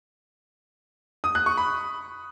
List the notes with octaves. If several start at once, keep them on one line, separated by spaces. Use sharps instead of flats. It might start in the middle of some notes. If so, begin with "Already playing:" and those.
D#6
F#6
C#6
B5